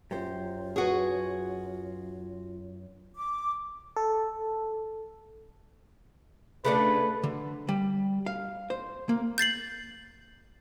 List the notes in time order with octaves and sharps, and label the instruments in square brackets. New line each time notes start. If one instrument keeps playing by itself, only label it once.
[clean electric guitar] F#2 [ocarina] F4 [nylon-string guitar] G4 C5
[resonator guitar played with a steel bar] F#4 G#4 [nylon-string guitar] B4 C#5
[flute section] D6
[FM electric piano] A4
[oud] C#3 A3 D4 [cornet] B4
[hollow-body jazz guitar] D3
G3
F5
C5
A#3
[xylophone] G6 A6 C7 F#7